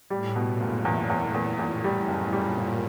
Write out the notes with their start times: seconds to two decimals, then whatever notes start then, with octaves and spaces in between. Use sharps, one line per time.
0.10 A2 G3
0.36 B2
0.47 A#2
0.60 F#1
0.85 E2 A2
1.10 E2
1.34 E2
1.59 E2 A2
1.84 G3
2.08 F#1
2.33 A#2 G3
2.57 F#1